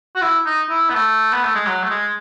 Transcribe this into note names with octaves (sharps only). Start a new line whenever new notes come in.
F#4
E4
D#4
E4
B3
A3
B3
A3
G#3
F#3
A3
G#3